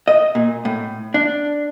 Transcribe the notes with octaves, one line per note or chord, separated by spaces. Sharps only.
D#5
A#2
A2
D4